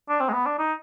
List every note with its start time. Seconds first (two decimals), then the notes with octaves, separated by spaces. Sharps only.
0.09 D4
0.20 C4
0.29 G#3
0.33 B3
0.46 D4
0.58 D#4